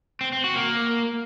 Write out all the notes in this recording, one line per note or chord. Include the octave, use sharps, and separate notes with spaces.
C4
C4
F#4
A#3